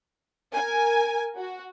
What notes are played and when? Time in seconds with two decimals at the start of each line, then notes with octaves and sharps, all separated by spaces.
0.53 A#4 G#5
1.37 F#4